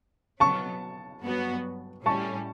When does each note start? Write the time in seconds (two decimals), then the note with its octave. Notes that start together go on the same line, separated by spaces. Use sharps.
0.40 B2 F#3 B3 A5 C#6
1.24 G2 F#3 B3 F#4
2.06 A2 G3 C#4 A5 C#6